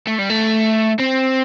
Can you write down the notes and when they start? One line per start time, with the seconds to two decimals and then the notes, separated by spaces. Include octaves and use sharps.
0.07 A3
0.18 G3
0.30 A3
1.00 C4